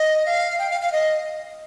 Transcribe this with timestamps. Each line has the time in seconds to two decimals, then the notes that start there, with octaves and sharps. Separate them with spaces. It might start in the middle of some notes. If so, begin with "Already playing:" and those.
Already playing: D#5
0.26 F5
0.59 G5
0.70 F5
0.81 F5
0.92 D#5